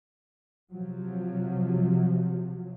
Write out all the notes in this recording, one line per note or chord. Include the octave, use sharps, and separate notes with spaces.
C3 F3 F#3